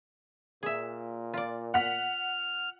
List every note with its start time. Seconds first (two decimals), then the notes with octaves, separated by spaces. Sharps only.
0.63 A#2 G#4 E5
1.34 F4 D5
1.74 F#5 F6 B6